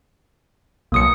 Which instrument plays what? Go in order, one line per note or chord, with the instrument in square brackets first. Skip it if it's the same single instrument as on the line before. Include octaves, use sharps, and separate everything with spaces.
[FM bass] B1 [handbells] A#3 D#6 C#7